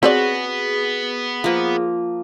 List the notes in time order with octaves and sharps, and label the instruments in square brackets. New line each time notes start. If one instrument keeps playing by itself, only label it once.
[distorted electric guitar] B3 [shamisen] C4 C#5 D5 [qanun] F#4 [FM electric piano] G#4
[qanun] F3 A#3